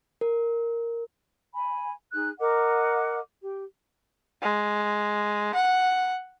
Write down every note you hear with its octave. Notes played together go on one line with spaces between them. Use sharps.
A#4
G#5 B5
D#4 G#4 F#6
A#4 D#5 F#5 D6
G4
G#3
F#5